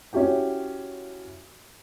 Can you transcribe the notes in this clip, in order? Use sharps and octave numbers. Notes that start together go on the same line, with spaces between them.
C#4 E4 F#4 G4 G5